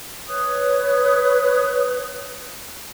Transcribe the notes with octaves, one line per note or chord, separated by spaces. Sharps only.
B4 C#5 D#6 F#6